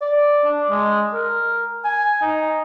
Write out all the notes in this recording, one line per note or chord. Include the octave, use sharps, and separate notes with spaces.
D5
D4
G#3
A#4
G#5
D#4